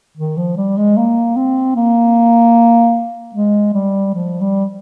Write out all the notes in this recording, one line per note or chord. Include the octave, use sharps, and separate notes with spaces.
D#3
F3
G3
G#3
A#3
C4
A#3
G#3
G3
F3
G3